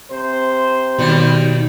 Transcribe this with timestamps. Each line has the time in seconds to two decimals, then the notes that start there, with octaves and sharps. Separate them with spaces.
0.11 C3 C5
0.99 D#2 B2 D#3 G3